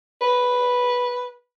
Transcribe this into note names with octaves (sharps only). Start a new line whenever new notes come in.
B4